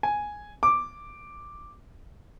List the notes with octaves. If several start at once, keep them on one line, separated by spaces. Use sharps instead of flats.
G#5
D6